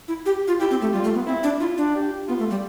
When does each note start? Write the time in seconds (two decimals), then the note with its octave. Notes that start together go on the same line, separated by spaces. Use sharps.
0.08 E4
0.26 G4
0.48 F4
0.60 E4 G4
0.71 C4
0.81 A3
0.93 G3 F4
1.04 A3
1.15 B3
1.27 C4 E4
1.43 D4
1.60 E4 F4
1.78 D4
1.95 G4
2.28 B3 F4
2.39 A3
2.50 G3